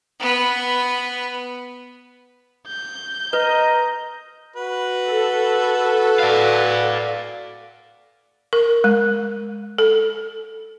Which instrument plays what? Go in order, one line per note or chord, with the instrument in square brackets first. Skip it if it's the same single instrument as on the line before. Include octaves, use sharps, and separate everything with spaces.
[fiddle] B3 B4
[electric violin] G6
[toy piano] B4 [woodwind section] D#5 [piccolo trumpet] A#5
[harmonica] F#4 B4
[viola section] A4
[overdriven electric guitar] D5 F5
[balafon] A#4
G#3
A4